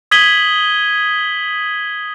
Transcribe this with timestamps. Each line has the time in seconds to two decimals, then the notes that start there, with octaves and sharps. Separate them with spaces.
0.11 D#6 G#6 B6 D#7 F#7 G7